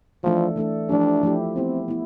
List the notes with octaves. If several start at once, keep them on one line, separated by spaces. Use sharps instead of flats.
E3 F3 A3 D4 A4
E3 A3 D4 A4
F3 A3 D4 E4 G4
F3 A3 E4 G4
B3 C4 E4 G4
B3 E4